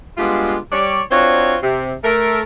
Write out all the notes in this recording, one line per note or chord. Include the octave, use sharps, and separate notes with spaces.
G3 G#3 B3 D4 F4
G3 C#5 D5
C4 D4 F4 F#4 C5 C#5
C3
A3 A4 A#4